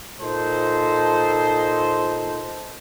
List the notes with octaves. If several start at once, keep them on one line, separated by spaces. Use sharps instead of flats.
A#2 D#4 A4 C5